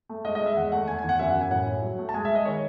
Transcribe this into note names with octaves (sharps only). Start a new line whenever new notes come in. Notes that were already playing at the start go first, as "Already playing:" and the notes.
A3
G#3 D#5
D#5
G#3
E5
E2 F#5
A3 F#5
E2 G#5
G#5
E2
F#5
F#2 E5
F#5
F#2
G#5
A2 F#5
A2
F#3
A3
A5
G#3 G#5
E5
G#3
D#5
D#3 C#5